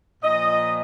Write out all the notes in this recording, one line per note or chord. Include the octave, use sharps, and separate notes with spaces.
A#2 F3 D#5